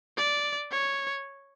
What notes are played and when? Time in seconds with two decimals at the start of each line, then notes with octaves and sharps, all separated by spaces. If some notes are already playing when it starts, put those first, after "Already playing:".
0.17 D5
0.72 C#5